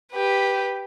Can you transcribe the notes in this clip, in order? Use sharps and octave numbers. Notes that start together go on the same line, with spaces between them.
G4 B4